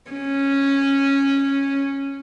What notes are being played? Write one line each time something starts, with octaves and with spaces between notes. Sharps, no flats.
C#4